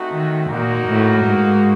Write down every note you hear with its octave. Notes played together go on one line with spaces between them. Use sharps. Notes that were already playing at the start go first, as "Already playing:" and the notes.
Already playing: A3 C4 D#4 F#4
D#3
A#2 A#3 D#4 F#4 A#4
A2
G#2